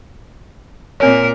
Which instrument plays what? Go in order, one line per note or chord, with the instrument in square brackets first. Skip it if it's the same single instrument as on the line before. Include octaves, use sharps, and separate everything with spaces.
[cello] A#2 A#4 [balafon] C4 C#5